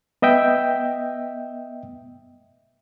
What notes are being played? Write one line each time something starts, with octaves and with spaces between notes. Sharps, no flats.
B3 D#5 E5 G5